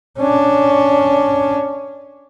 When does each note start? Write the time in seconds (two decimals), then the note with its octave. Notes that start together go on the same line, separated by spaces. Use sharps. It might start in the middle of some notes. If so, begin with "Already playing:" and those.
0.19 C#4 D4